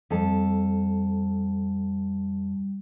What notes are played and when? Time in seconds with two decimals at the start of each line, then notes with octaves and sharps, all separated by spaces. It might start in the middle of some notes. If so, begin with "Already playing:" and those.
0.11 F2 G3 A4